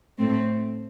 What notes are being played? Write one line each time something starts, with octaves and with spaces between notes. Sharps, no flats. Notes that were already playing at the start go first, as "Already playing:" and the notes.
A2 A3 C4